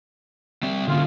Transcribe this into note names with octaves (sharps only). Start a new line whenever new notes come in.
G3 C4 E5
D3 A#3 C#4 F4